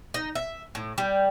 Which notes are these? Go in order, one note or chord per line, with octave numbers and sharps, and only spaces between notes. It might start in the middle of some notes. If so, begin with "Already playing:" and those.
D#4
E5
A2
G3